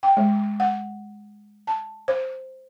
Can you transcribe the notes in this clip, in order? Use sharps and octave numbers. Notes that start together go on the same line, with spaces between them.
G5
G#3
F#5
A5
C5